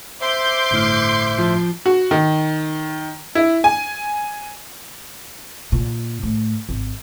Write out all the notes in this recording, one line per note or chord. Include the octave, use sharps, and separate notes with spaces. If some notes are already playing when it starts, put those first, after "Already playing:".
C5 E5 C6 D6 G6
G1 A2 F6
F3
F#4
D#3
E4
G#5
A#2
A2
G#1